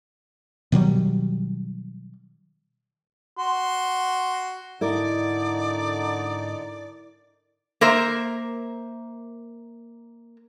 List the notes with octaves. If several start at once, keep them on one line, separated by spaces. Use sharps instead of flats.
B2 D#3 F#3 G3
F#4 C6
G#2 D3 D#4 E4 A#4 D5
A#3 A#4 C5 E5